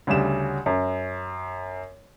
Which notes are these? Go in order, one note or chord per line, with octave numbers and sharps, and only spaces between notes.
D2 C#3 G3 E7
F#2